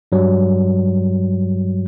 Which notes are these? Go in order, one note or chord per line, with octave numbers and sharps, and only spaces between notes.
G2 F#3 G3